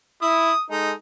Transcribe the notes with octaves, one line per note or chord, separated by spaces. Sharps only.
E4 D#6
G#3 D#4 A4 D#5